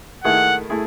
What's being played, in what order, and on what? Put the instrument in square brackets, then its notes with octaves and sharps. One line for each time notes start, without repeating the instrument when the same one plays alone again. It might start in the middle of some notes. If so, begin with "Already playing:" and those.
[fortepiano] D#3 A3 E4 G#4 [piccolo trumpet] F#5
[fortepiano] A3 E4 G#4